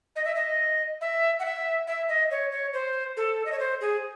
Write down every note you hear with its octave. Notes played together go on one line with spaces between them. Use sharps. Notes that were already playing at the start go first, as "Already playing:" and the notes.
D#5
E5
D#5
E5
F#5
E5
E5
D#5
C#5
C#5
C5
A4
D#5
C#5
C5
G#4